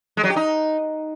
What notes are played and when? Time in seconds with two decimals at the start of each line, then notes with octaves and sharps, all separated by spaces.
0.17 G#3
0.24 F#3
0.30 G4
0.36 D#4